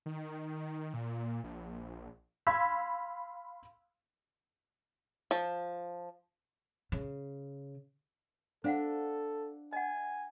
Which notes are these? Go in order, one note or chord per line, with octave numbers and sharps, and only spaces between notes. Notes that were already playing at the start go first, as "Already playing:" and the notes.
D#3
A#2
A#1
F5 B5 C6 E6 G#6 B6
F3
C#3
D4 A4 C5 F5 F#5
D#5 F#5 G#5